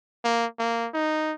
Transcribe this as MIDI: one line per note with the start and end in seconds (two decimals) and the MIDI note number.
0.25 0.46 58
0.59 0.89 58
0.94 1.34 63